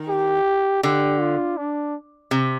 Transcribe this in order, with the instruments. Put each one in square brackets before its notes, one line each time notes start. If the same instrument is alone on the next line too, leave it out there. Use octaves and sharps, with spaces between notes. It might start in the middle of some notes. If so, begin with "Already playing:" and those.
Already playing: [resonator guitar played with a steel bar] D#3
[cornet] G4
[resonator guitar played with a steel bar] D3 [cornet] G4
[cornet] F4
D4
[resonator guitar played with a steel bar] C3